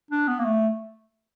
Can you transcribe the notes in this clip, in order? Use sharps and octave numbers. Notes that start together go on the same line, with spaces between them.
D4
B3
A#3
A3